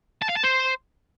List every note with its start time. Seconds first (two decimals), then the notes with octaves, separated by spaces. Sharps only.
0.22 A5
0.29 F5
0.37 A5
0.44 C5